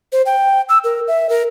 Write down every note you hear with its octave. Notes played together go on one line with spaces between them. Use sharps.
C5
G5
E6
A#4
E5
A#4